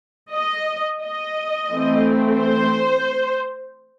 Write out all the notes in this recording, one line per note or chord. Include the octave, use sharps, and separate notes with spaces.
D#5
D#5
E3 A3 C4
C5